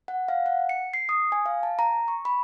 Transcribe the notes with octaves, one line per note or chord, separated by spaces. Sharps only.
F#5
F5
F#5
C#7
C7
D#6
G#5
F5
A5
A#5
C#6
B5